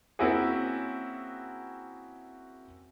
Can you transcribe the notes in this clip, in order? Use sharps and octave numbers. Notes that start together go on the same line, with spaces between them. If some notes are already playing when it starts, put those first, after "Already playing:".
A#3 C4 C#4 E4 F#4 G#4